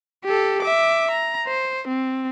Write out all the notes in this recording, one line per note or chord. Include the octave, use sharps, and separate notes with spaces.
G4 A4
E5 D6
A#5
C5
C4